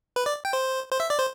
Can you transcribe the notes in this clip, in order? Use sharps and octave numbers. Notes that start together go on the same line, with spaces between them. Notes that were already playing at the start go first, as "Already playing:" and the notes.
B4
D5
G5
C5
C5
E5
D5
C5